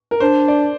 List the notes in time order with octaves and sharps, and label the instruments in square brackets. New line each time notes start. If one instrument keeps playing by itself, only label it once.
[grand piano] A#4
[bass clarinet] D4 [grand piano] C5
[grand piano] D5